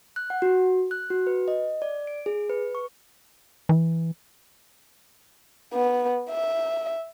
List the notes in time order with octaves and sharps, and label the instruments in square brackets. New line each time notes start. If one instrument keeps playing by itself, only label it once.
[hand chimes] F#6
F#5
F#4
F#6
F#4
B4
D#5
D5
D7
G#4
B4
C#6
[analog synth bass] E3
[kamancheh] B3
E5